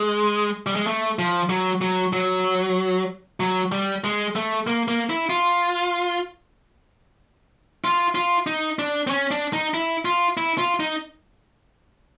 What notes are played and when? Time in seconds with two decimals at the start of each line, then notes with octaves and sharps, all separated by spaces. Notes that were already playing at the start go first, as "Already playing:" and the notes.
Already playing: G#3
0.67 G3
0.76 G#3
0.87 A3
1.19 F3
1.50 F#3
1.82 F#3
2.13 F#3
3.40 F#3
3.72 G3
4.04 G#3
4.36 A3
4.67 A#3
4.88 A#3
5.10 E4
5.30 F4
7.84 F4
8.15 F4
8.47 D#4
8.79 D4
9.07 C4
9.11 C#4
9.31 D4
9.53 D#4
9.74 E4
10.05 F4
10.37 E4
10.58 F4
10.80 D#4